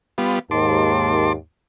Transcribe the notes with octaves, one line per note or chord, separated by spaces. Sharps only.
G3 B3 F4
D#2 G#2 A5 C6 D6